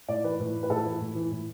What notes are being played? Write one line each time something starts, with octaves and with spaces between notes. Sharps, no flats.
A2 D5
E3 B4
A2
E3
B4
A2 A4
E3 E4
A2
E3
A2